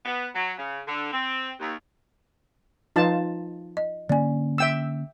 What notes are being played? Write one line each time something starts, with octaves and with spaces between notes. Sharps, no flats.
B3
F#3
C#3
D3
C4
D#2
F3 D#4 F4 B4 F5 A5
D#5
D3 A#3 C#4 D5 G#5
E5 G5 E6